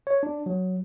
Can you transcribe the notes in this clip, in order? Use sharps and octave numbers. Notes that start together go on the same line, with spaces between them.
C#5
D4
F#3